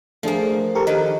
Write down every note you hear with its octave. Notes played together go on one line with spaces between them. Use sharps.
F3 A3 A#3 D4 G#4
G4 A4 A#4 C#6
D#3 A#3 D#4 G4 B4